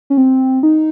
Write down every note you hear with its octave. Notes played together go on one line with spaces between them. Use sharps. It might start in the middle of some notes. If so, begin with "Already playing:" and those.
C#4
C4
D#4